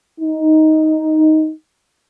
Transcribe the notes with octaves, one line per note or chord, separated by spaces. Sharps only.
D#4